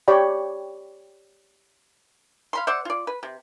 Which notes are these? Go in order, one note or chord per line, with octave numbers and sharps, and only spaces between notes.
G4 C#5 D5 G5 B5
F5 B5 C6
C5 D5 E5 F#5
F4 D5
B4
C3